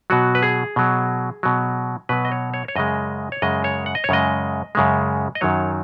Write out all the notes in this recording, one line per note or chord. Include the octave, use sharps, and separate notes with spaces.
B2 F#3 F#4
B4
G#4
B2 F#3
B2 F#3
B2 F#3 B4
D#5
C#5
C#5
C#5
F#2 C#3 G#3 D#5
C#5
F#2 C#3 G#3 D#5
C#5
F#5
D#5
C#5
F#2 C#3 G#3 D#5
F#2 C#3 G#3
D#5
F#2 D#3 F#3 C#5